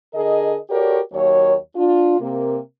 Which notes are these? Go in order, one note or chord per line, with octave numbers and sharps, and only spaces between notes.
D3 G#4 A#4 D#5
F#4 G4 A4 A#4 C#5 D5
D#2 F#3 A#3 C#5
D4 F4
C3 A#3